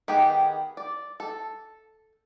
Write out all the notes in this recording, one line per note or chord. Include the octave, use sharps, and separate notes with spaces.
D#3 B3 G4 G#4
D5
A4